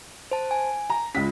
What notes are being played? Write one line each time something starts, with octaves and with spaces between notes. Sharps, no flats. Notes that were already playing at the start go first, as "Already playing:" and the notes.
C5 A5
G#5
A#5
C#2 C#4 F4 B6